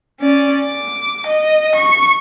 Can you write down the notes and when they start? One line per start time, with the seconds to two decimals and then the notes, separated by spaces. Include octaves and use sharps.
0.21 C#4 D5
0.65 D6
1.27 D#5
1.75 C#6